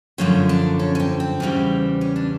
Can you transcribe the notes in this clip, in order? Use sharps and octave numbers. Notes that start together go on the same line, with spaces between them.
F#2 D3 F3 A3 C#4
D4
C#4
C#4
C4
C4
E2 C#3 E3 G3
C#4
D4